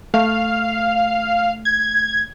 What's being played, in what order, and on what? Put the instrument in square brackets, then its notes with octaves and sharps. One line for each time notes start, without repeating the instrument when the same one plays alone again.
[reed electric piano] A3 [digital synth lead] F5
[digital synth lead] G#6